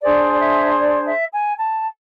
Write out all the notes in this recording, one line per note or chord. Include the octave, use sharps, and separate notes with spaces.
D4 G#4 C5 D5
D5
E5
D5
E5
G#5
A5